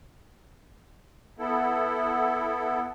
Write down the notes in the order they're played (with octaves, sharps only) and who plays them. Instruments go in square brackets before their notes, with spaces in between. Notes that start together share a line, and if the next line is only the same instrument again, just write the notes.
[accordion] B3 E4 A4